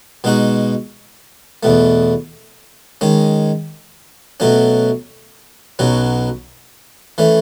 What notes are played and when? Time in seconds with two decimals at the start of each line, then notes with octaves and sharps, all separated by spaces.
0.24 B2 G#3 D#4 F#4
1.63 E2 B2 A3
3.01 D#3 G#3 C#4
4.40 B2 F#3 A3 C#4
5.79 B1 B2 F#3 C#4
7.18 E3 A3 C#4